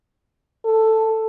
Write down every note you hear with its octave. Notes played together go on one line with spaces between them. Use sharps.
A4